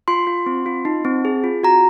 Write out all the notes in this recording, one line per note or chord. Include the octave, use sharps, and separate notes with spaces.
F4 C6
F4
C4
F4
D#4
C4
G#4
F4
F#4 A#5